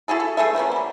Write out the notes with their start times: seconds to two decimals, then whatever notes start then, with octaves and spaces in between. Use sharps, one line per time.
0.08 E4 F#4 G#4 A4
0.20 A4
0.37 A3 G#4 A4 E5
0.55 F3 A#3 B3 C#4
0.72 F#3 G3